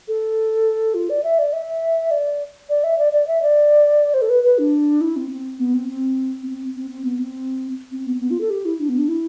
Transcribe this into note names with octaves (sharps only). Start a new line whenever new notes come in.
A4
F4
D5
E5
D5
E5
D5
D5
E5
D5
D5
E5
D5
C5
A4
B4
B4
D4
E4
C4
C4
B3
C4
C4
C4
C4
C4
B3
C4
C4
B3
C4
B3
F4
A4
G4
E4
D4
B3
D4
E4